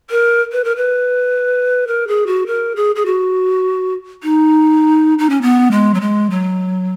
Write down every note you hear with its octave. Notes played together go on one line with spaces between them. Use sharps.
A#4
B4
A#4
B4
A#4
G#4
F#4
A#4
G#4
G#4
F#4
D#4
D#4
C#4
B3
G#3
F#3
G#3
F#3